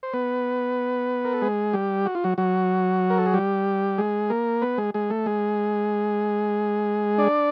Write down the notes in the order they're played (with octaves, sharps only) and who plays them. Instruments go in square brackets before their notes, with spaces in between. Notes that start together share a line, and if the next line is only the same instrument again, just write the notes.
[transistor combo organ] C5
B3 B4
A#4
A4
G#3 G#4
G3 G4
F#4
F4
F#3 F#4
F#3 F#4
A#4
A4
G#4
G3 G4
G#3 G#4
A#3 A#4
B3 B4
G#3 G#4
G#3 G#4
A3 A4
G#3 G#4
D4 D5